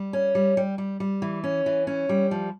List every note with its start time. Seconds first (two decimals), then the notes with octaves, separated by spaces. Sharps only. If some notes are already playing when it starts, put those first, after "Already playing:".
Already playing: G3
0.13 C#4
0.35 G3
0.57 G3
0.78 G3
1.00 G3
1.22 E3
1.44 C#4
1.66 E3
1.87 C#4
2.09 G3
2.31 F3